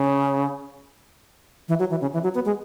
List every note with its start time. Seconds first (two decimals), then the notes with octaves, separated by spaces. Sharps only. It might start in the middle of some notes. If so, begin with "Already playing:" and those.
Already playing: C#3
1.69 E3
1.79 F#3
1.90 E3
2.01 C#3
2.13 E3
2.23 F#3
2.35 B3
2.45 G#3